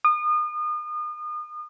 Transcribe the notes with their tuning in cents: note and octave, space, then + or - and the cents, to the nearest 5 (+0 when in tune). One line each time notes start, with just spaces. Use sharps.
D#6 -35